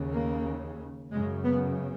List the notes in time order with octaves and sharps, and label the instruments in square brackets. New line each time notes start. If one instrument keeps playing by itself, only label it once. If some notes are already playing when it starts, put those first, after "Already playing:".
Already playing: [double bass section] D#2 C#3
A#3
F#2 C#3 G#3
B3